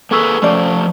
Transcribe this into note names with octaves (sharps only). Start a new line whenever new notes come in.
A#3 G#4 A4 B4 C#6 E6
F3 A3 C#4 C5 D5